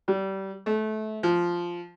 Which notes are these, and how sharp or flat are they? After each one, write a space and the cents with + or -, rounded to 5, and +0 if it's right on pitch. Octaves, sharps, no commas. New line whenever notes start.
G3 -25
A3 -25
F3 -5